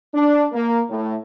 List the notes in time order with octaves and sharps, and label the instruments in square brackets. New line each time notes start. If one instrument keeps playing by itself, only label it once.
[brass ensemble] D4
A#3
A2